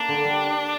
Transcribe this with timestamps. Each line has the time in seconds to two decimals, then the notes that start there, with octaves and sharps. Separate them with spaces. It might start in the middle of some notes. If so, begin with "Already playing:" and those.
Already playing: A#3 D4
0.09 D3
0.24 G3